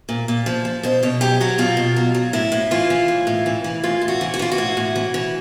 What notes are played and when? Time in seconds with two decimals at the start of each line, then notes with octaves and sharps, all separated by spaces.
0.09 A#2
0.28 A#2
0.46 F3
0.65 F3
0.83 B2 C5
1.03 B2 C#5
1.21 F#3 G4
1.41 F#3 F#4
1.58 B2 F4
1.77 B2
1.96 F#3
2.14 F#3
2.33 A2 E4
2.52 A2
2.71 E3 F4
2.90 E3
3.08 A2
3.27 A2
3.46 E3
3.64 E3
3.83 A2 F4
4.02 A2
4.08 F#4
4.21 E3
4.34 F#4
4.39 E3 F4
4.52 F#4
4.58 A2
4.77 A2
4.96 E3
5.14 E3